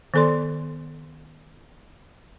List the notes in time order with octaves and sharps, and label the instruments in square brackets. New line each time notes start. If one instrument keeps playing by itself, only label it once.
[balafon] D#3 B3 A4 D5 C6